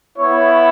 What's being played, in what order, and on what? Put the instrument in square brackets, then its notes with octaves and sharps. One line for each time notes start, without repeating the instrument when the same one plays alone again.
[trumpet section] B3 E4 C#5